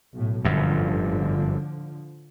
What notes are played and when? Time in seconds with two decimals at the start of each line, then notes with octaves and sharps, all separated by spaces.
0.13 B1 A2
0.45 G1 F#2 A2 D3 F3